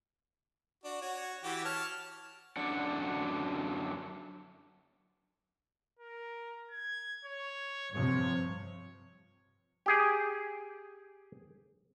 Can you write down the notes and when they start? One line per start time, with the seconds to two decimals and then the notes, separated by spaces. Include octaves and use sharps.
0.84 D4 F#4
1.02 F#4 C#5
1.43 E3 F#4 G4
1.65 C#5 A5 F6
2.57 F#2 D3 F#3 D4 D5 F#5
5.99 A#4
6.71 G#6
7.25 C#5
7.93 G2 C3 F3 C#5
9.86 G4 G#4 G5